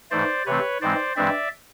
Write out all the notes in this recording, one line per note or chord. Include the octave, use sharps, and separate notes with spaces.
G#2 E3 A3 C5 D5
C3 E3 A3 C4 B4 C#5
G#2 E3 G#3 C4 C5 D5
G2 E3 G#3 C4 D5 E5